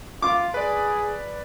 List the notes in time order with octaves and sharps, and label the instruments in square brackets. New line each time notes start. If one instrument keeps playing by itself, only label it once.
[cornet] F4 [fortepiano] D6
[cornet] G#4 [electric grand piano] B4 D5